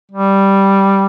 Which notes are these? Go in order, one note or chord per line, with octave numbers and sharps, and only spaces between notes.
G3